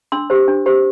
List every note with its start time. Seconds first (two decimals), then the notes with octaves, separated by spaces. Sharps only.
0.12 D4 C6 E6
0.30 G4 C5
0.48 D4
0.66 G4 C5